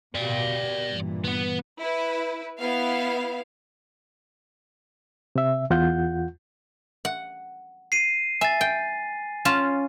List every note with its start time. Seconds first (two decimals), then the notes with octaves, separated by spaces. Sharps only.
0.15 B2 G4 D5 F5
0.89 G2 A#2 E3
1.24 B3 B4
1.79 E4 B4
2.58 B3 E4 F5
5.36 C3 E5
5.70 E2 F4 F#5 G6
7.05 F#5
7.92 C7 D#7
8.41 E5 G#5 A6
8.61 G5
9.45 C#4 F4 A5